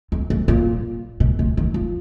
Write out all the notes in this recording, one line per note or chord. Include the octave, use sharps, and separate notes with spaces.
F2
F#2
A#2
B2
A#2
D#3
F3